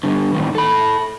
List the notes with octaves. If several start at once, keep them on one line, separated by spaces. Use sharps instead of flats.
G2 D3
A2 D#3
A4 B5